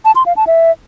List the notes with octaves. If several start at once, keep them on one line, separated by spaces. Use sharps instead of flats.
A5
C6
F5
A5
E5